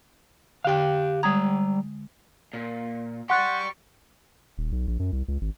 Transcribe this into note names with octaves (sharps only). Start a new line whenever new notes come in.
D3 G4 F5 G5
G3 G#3 A#5 D#6 G#6
A#2
G4 D5 F#5 C6 C#6 F#6
D#1
B1
A#1
F#2
C2
C#2
G#1